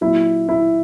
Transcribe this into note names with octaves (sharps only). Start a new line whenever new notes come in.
A#2 F#3 E4
E4